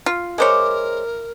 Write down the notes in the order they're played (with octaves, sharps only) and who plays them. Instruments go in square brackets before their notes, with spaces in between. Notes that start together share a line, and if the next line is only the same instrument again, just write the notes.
[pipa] F4
[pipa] G#3 C5 C#5 [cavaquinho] E4 D6 [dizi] A#4